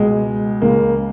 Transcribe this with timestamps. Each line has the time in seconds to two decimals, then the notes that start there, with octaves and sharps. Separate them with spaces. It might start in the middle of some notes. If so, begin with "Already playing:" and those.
Already playing: C#2 B2 G#3
0.62 C#2 C#3 A#3